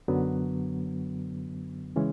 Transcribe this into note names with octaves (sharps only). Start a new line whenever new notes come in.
F#2 D3 F#3 B3
C#3 E3 G#3 C#4